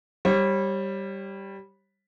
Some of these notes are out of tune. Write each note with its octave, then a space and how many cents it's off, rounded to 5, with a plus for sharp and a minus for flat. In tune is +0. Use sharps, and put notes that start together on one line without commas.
G3 +0 C#5 -35